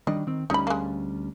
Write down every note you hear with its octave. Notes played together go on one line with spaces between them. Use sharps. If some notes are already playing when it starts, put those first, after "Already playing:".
D#3 G3 D4 D#5
D#3 C4
D2 G3 C#4 D#4 B5
G#3 A#3